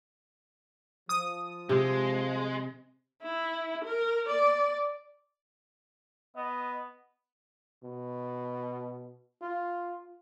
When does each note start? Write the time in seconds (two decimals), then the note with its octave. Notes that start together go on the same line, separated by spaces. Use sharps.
1.09 F3 D#6
1.69 C3 G#3
3.23 E4
3.85 A#4
4.28 D5
6.36 B3 D#5
7.84 B2
9.41 F4